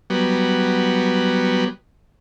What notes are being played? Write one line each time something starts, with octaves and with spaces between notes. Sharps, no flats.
F#3 G3 B3